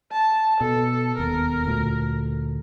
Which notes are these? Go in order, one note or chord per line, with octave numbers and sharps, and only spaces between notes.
A5
B2 A4
E1 D#2 B3 A#4
D2 A#2 A3